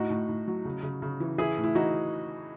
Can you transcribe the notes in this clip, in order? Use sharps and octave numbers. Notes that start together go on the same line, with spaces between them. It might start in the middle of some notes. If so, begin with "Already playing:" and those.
Already playing: A2 D#4 F#4
A2
A2
F#3
C#3
C#3
C#3
E3
E3 E4 G#4
A2
E4
E3 D#4 F#4